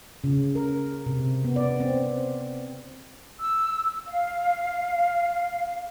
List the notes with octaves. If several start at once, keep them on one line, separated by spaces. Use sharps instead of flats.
C#3
A#4
C3
B3
D5
C4
E6
F5